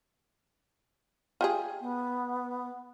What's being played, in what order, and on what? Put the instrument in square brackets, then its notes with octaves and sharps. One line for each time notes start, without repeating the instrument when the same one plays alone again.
[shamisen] F4 G4 G#4
[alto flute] B3